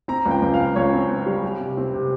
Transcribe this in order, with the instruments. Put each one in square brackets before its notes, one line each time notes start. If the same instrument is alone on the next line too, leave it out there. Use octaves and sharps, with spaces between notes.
[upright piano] C4 A#5
C#2
G5
C#2
F5
C#2
C#2 C#5
C4
C4
G3
G3
C3
C4
C3